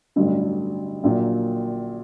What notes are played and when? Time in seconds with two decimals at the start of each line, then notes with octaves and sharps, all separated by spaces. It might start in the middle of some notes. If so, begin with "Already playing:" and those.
0.16 A1 G2 D3 F#3
1.04 A#1 A#2 F#3 A#3